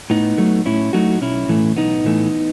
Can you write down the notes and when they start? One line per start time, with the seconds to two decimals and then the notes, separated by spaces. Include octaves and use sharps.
0.10 A2 B3 D#4
0.38 F#3 A3
0.66 A2 C#4 E4
0.93 F#3 A3 D#4 F#4
1.21 B1 C#4 E4
1.49 A2 E3 A3
1.76 B1 B3 D#4
2.04 A2 E3 A3